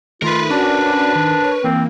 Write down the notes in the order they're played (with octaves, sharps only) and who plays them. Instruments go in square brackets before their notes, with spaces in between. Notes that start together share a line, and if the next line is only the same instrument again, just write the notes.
[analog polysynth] D#3 A3 [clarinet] F4 [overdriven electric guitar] A#4 B4
[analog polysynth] C#4 F#4 D5 [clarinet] D4
[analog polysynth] D#3
C#5
[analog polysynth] E3 A#3 [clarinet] C4